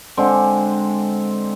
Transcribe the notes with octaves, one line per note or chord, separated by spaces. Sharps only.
D3 G#3 C4